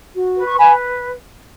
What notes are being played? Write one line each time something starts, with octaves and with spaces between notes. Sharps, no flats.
F#4
B4
C#6
B4 G#5 B5